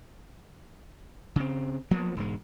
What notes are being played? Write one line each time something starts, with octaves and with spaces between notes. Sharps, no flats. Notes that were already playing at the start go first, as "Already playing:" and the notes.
C#3 C4
F3 F#3 A#3 B3
E1 G#2 G#3